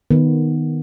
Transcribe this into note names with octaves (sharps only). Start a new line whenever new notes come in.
D#3 B3